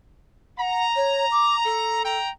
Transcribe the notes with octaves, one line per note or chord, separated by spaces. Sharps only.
F#5 A#5
C#5
D6
A4
G5 A#5